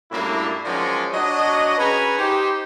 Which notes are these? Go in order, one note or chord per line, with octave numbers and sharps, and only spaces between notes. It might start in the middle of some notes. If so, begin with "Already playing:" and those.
F#2 A2 G3 A#3 D4 E4
D#3 F3 F#3 G#3 C#4 D5
F#3 D4 F#4 D#5
C#4 G#4 B4 G#5 A#5 B5
D#4 G4 C5